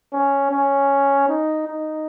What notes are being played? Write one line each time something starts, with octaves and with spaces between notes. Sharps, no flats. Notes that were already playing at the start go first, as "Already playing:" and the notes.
C#4
C#4
D#4
D#4